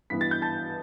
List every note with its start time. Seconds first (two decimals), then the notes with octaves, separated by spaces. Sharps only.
0.10 G2 E3 B3 B6
0.21 A6
0.31 G6
0.42 A5 A6